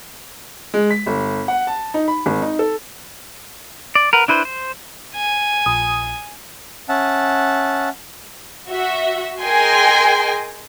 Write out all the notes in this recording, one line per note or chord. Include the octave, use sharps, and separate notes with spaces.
G#3
B6
G1
F#5
A5
D#4
B5
G#1
D#4
A4
D5
A#4 B4 F#5
D4 E4 B4 C5
C5
G#5
A#1 D#6
C#4 E5 F#5 A5
F#4 E5
G#4 A#4 D#5 G5 G#5 C6